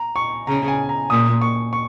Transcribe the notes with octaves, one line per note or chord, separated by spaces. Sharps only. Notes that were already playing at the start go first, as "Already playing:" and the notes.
Already playing: A#5
C#6
C#3 A#5
G#5
A#5
A#2 D#6
C#6
C#6